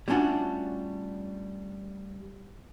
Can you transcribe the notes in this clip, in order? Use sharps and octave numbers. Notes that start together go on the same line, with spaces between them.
G3 A3 C#4 D4 F4 F#4